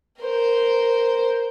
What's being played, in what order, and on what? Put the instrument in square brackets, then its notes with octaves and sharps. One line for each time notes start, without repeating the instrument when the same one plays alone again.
[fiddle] A#4 C5